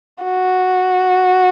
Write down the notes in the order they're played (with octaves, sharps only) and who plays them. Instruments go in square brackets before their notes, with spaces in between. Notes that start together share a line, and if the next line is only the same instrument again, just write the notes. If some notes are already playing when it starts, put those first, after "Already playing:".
[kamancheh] F#4